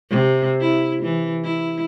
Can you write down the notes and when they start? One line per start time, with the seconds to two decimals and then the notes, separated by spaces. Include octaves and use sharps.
0.10 C3
0.60 E4
1.03 E3
1.44 E4